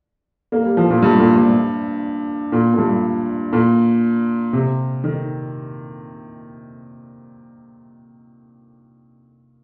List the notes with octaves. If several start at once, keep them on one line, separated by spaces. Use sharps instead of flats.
A#3
G3
F3
A#2
G2
A#2
G2
A#2
A#2
G2
A#2
C3
D#3